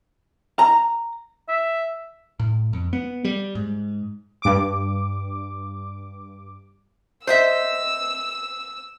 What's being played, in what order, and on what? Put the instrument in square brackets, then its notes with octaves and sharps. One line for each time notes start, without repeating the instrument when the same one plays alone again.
[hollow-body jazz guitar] A#5
[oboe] E5
[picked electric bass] A2
F2
B3
G3
G#2
[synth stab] G2 D6
[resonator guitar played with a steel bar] C5 D#5 E5 [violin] E6